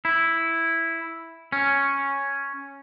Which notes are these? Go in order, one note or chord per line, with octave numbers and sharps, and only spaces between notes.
E4
C#4